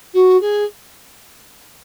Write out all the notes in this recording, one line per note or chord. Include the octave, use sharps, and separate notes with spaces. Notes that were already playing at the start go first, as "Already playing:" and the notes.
F#4
G#4